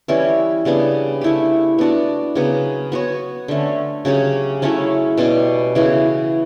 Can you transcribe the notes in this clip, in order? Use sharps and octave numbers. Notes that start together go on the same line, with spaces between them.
E3 G3 C#4 E4
C#3 G3 B3 D4
A3 E4 G4
B3 D4 F#4
C#3 F#3 B3
B3 F#4 C#5
D3 A3 C#4
C#3 F#3 C#4 G4
F#3 A3 C#4 E4
B2 G3 C#4 G4
C#3 E3 B3 F#4